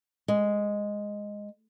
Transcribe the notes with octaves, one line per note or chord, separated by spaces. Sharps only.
G#3